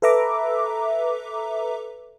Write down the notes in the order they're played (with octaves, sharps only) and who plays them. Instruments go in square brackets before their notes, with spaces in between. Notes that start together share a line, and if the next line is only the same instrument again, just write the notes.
[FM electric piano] A4 B4 E5 A#5 D6